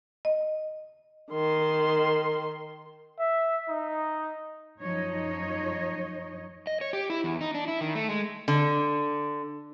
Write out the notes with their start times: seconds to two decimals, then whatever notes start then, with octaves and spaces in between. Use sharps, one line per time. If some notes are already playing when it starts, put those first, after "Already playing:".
0.25 D#5
1.31 D#3 C6
3.19 E5
3.69 D#4
4.81 F#2 F3 D#4 C#5 D#5
6.67 D#5
6.81 C#5
6.93 G4
7.10 E4
7.24 E2
7.41 D#4
7.54 D4
7.68 E4
7.81 D#3
7.95 A3
8.09 G#3
8.48 D3